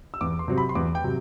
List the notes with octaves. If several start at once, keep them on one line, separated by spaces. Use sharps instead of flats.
E6
E2 D6
C6
C3 F#3 C4
B5
C6
E2 D6
G5
C3 F#3